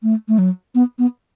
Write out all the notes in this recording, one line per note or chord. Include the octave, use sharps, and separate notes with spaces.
A3
A3
F#3
B3
B3